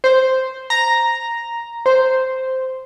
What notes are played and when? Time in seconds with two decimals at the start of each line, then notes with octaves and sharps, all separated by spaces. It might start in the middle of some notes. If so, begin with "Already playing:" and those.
0.04 C5
0.70 A#5
1.86 C5